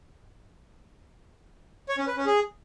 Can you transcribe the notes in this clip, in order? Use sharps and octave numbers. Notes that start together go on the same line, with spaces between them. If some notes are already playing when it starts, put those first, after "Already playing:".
C#5
C#4
B4
C#4
G#4